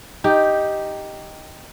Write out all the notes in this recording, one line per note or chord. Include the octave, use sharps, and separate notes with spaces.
D#4 G4